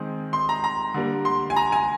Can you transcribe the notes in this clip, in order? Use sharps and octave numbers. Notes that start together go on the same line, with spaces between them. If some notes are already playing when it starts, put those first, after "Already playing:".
Already playing: D#3 G#3 C4
C6
A#5
A#5
D3 G3 A#3
C6
G#5
A#5
G#5